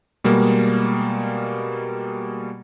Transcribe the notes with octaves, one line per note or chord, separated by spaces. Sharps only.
B2 G3 G#3 A#3